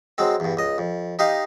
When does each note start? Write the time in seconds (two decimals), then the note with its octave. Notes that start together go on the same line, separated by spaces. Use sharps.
0.18 F#3 G#3 C4
0.40 E2 G2
0.57 C#2 D#5
0.78 F2
1.19 D#4 G4 D#5 F5